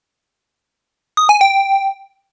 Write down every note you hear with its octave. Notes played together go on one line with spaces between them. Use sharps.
D#6
G#5
G5